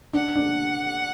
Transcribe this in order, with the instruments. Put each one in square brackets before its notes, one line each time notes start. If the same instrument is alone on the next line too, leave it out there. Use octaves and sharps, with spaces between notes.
[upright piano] D4 [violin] F#5
[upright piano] D4